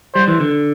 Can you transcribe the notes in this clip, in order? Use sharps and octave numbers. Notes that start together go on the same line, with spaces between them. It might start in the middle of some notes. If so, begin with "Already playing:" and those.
G3 C5
E3
D3